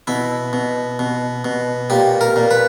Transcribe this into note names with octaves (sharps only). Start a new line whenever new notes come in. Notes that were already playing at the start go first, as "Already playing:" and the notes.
B2 E4
B2
B2
B2
A#2 G4
A#4
A#2
B4